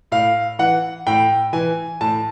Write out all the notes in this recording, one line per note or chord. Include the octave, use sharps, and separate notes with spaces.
A2 F5
E3 F#5
A2 G5
E3 G#5
A2 A5